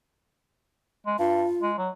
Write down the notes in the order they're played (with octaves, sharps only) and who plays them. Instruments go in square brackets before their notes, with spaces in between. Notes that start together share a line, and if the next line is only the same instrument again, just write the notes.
[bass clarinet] G#3
[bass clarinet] G2 [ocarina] F4
[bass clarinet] G#3
F#3